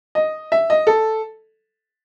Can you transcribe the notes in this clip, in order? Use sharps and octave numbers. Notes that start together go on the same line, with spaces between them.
D#5
E5
D#5
A4